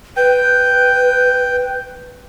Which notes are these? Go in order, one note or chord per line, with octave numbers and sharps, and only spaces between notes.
B4 G5